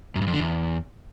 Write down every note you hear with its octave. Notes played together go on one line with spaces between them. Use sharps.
F#2
G2
F2
D3
E2